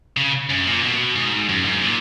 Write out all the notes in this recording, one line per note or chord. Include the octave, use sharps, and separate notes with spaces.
C#3
F#2
A#2
B2
G#2
F#2
G#2
A#2